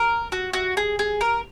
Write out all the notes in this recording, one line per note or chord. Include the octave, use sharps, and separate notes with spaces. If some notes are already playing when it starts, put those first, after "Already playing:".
Already playing: A#4
F#4
F#4
G#4
G#4
A#4